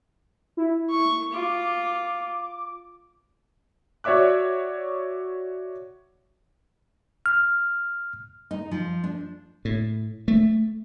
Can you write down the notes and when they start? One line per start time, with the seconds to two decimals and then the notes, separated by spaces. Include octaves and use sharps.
0.57 E4
0.90 C#6
1.34 F4 D6
4.04 F#4 C#5 D5 E5 D6 F#6
7.26 F6
8.51 D#4
8.71 F3
9.04 D4
9.65 A2
10.28 A3